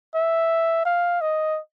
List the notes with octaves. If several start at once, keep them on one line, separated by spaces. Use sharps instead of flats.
E5
F5
D#5